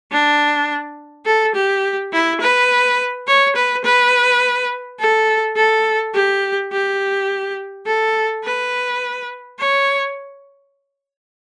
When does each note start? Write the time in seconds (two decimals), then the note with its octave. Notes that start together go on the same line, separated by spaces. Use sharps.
0.12 D4
1.26 A4
1.55 G4
2.13 E4
2.41 B4
3.27 C#5
3.55 B4
3.84 B4
4.99 A4
5.56 A4
6.14 G4
6.72 G4
7.86 A4
8.44 B4
9.59 C#5